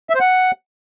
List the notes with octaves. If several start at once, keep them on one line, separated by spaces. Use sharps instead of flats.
E5
C5
F#5